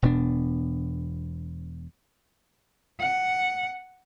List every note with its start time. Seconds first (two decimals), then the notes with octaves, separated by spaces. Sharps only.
0.02 E1 B2 B3 D4
3.01 F#5